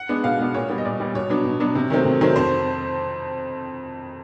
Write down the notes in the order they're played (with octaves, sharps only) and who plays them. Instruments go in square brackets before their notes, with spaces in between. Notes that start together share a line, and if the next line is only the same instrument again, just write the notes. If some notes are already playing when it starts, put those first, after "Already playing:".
Already playing: [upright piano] F#5
G#3 B3 D4
B2 F5
G#3 B3 D4
A#2 C#5
G3 B3
D#5
A#2 D5
G3 B3
B2 C#5
F#3 B3 D4
B2
F#3 B3 D4
C3
D#3 F#3 A3 C4
C3
D#3 F#3 A3 C4
F2 C5